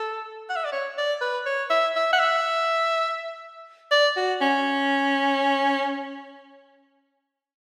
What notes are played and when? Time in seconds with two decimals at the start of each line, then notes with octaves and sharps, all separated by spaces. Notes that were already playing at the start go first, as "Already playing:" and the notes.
Already playing: A4
0.50 F#5
0.56 E5
0.65 D5
0.72 C#5
0.98 D5
1.21 B4
1.46 C#5
1.70 E5
1.96 E5
2.13 F#5
2.19 E5
3.91 D5
4.17 F#4
4.41 C#4